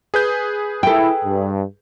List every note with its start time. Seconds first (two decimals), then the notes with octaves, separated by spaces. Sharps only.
0.14 G#4 B4 G6
0.83 E4 A4 G5
1.24 G2